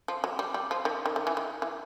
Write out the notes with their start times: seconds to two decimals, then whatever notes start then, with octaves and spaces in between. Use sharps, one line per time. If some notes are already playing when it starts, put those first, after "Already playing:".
0.08 F3
0.24 F#3
0.39 G3
0.54 G3
0.71 F3
0.85 D#3
1.06 D#3
1.16 D#3
1.27 E3
1.37 D#3
1.62 E3